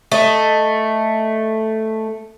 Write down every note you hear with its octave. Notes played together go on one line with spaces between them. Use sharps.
A3 D#5